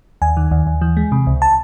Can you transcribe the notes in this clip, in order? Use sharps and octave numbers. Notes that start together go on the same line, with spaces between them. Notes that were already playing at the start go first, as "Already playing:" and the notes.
D#2 G#5
D#3
D#2
D#2
E3
G#3
C3
C#2
A5